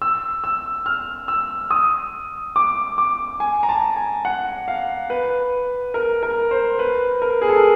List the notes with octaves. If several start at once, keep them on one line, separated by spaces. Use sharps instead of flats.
E6
E6
F6
E6
D#6
D6
D6
G#5
A#5
A5
G#5
F#5
F5
B4
A#4
A#4
C5
B4
A#4
G#4
A4
A#4